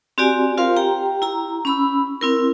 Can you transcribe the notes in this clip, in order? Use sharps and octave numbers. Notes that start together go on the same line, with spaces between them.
C4 F#4 G4 D5 G#5
F4 A#4 C5 F5 C6
G4 G5 A#5
E4 A#5
C#4 B5 E6
C4 E4 A#4